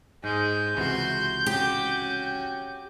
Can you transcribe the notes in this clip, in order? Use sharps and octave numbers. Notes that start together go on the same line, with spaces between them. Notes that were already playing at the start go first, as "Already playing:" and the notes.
G#2 G#3 G6
C#2 C3 E3 F#4 C6
C#4 F#4 G4